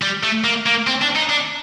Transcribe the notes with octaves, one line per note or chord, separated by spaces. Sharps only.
G3
A3
A#3
A#3
C4
D4
D#4
D4